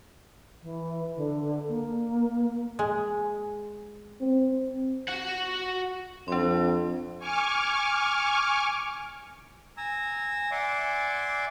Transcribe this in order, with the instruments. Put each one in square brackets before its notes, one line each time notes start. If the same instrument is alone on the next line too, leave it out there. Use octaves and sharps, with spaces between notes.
[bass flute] E3
D3
A#3
[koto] G#3
[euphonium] C4
[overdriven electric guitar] F#4 F#5
[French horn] F2 [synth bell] D4 C6
[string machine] G#5 C#6 D6 F6
[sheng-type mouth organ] G#5 A#5 E6
D5 E5 F#5 G#5 C6 D6